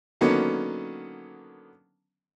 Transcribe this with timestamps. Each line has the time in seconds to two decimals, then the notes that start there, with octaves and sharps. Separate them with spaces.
0.21 D3 D#3 F#3 A#3 B3 C#4